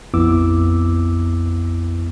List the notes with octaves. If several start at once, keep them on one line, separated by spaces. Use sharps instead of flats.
A#1 F2 B3 E4 D6 E6